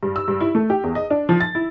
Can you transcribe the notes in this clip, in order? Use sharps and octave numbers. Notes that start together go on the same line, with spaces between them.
G2
E6
G2
E4
A3
G4
E2
D#5
D4
F3
A6
E4